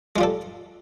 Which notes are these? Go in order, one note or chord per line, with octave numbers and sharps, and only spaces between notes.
G3 G#3 F4 A4